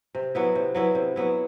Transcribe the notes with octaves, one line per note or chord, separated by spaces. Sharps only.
C3
F#3 B3 E4
C3
F#3 B3 E4
C3
F#3 B3 E4